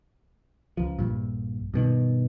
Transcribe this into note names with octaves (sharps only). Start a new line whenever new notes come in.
C#2 F3
A#1 G2
G2 B2 D#3